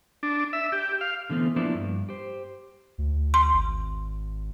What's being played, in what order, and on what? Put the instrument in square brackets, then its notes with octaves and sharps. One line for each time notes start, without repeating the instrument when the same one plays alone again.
[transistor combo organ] D4
E5
G4
F5
[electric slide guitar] D3 E3 A3 B3 C4
F3 A#3 B3 D4 E4
G2
G4 C5
[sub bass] D2
[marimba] C6
[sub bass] G#1